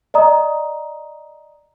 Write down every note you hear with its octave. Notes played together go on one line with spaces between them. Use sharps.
D5 D#5 A#5 D#6